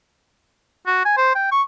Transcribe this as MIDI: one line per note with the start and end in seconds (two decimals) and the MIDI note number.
0.87 1.00 66
1.05 1.17 80
1.17 1.34 72
1.35 1.47 79
1.51 1.62 85